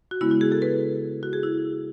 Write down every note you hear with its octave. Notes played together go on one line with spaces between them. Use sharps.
F#4
C#3 G#3 B3 E4
F#4
G#4
A4
B4
F#4
G#4
E4